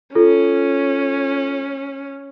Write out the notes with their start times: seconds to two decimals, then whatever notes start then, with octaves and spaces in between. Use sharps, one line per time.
0.15 C#4 F4 A4